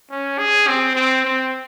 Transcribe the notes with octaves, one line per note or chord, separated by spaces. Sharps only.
C#4
G#4
C4
C4
C4